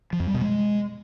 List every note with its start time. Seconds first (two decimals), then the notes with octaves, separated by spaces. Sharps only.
0.13 F3
0.20 F2
0.27 G3
0.34 B2
0.41 G#3